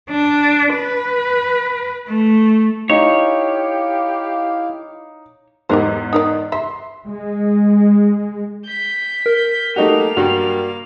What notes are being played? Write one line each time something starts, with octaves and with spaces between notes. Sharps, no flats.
D4
B4
A3
D#4 E4 G4 C#5 F5
E2 G#2 G4 A#4 C5
D#4 A#4 D5
E5 C6
G#3
G6 B6
A#4
A3 A#3 D#4 F#4 G4 F7
G2 G3 F#4